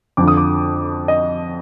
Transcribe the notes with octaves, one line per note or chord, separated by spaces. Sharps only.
F2 D3 F3 D6
D#6
D6
D#5